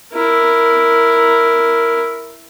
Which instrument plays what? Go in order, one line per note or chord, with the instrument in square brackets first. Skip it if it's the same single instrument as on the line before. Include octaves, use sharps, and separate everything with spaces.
[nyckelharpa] E4 A#4